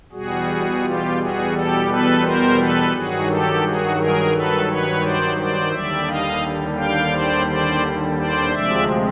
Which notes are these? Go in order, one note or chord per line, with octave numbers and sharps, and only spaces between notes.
E2 B2 G3 F#4 G#4
F4 G4
F#4 G#4
G4 A4
A4 B4
A#4 C5
A4 B4
G2 D#3 F#3 F#4 G#4
G4 A4
F#4 G#4
G#4 A#4
A4 B4
B4 C#5
C5 D5
C5 D5
D#2 D3 G3 D5 E5
D#5 F5
F5 G5
C5 D5
C5 D5
C5 D5
D2 C3 F3 G#3 D5 E5